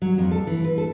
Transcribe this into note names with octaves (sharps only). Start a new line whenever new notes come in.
F#3
F2
A4
E3
B4
A4